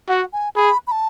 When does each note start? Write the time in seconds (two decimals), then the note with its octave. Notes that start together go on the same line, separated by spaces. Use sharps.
0.08 F#4 F#5
0.33 G#5
0.56 G#4 B5
0.87 B5
0.92 A5